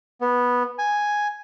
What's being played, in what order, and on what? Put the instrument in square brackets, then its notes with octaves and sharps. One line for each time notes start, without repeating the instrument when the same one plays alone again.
[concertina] B3
G#5